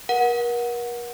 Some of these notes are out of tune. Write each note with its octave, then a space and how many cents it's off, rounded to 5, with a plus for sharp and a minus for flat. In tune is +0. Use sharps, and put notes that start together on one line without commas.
A#4 +40 F#5 -15